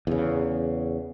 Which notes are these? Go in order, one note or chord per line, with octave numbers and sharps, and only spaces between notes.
E2 C#3